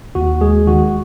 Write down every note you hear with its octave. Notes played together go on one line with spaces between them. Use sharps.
D#2 F#4
G#3 G#4
D#3 F#4